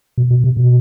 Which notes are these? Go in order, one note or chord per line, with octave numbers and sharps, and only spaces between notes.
B2
B2
C3
B2